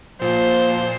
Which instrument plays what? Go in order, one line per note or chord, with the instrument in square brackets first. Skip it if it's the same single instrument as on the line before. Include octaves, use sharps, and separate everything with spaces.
[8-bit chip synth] A#2 [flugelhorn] F3 [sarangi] C5